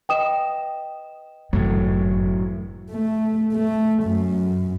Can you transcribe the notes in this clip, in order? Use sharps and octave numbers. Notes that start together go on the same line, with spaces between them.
B4 D#5 G5 D#6 E7
G1 F#2 A2 E3 F#3 A3
A3
A3
F#2